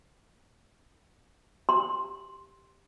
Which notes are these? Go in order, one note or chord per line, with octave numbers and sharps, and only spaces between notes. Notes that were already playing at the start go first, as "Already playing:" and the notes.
G4 C6